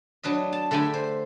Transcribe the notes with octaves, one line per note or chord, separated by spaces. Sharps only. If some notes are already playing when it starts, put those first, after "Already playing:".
F#3 D4 B4 D#5
A5
D3 A3 G4 D5 G#5 B5
C5